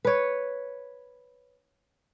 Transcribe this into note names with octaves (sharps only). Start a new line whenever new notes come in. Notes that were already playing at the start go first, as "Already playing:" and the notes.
B4 C#5